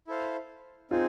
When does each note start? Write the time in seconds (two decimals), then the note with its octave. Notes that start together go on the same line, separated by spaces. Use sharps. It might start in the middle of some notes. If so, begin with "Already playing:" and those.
0.07 E4 A4 C5 F5
0.91 C4 D#4 F4 G#4